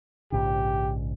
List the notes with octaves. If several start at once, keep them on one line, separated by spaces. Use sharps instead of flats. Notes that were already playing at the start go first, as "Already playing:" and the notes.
A#1 G#2 C#3 G4